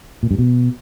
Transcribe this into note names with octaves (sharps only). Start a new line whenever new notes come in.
A#2
G2
B2